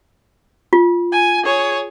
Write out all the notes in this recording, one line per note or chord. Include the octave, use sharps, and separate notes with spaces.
F4
G#5
G#4 C#5